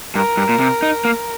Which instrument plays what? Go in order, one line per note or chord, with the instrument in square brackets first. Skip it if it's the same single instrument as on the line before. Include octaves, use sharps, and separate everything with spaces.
[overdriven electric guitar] G2 [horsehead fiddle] A#4
[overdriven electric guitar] G2
A#2
C3
D#4
A#3